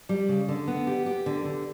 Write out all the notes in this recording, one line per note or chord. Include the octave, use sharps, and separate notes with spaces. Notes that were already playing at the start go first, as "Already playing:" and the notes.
G3
C#3
D3
B3
G4
G4
D3
D3